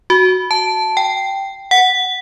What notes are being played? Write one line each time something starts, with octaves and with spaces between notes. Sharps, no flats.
F#4
A5
G5
F#5